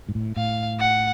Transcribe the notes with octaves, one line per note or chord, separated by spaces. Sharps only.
G#2
A2
A2 F5
F#5